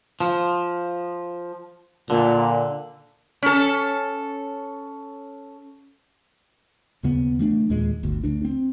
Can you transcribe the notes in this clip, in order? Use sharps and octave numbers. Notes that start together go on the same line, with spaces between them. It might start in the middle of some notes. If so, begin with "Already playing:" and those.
F3
A#2 D3
C#4 A4
D#2 C#3 B3
E3 A3 D4
D#2 A#2 G#3
G1 D2
D2 D4
C4